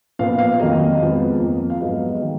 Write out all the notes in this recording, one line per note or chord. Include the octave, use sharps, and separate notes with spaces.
A#2 F3 B3 F5
F5
F2 D#3 F#3 A#3 D#5
F2 F3 G#3 B3
F2 F3 A#3
F5
G#2 F#3 B3 D#5
D#3 G#3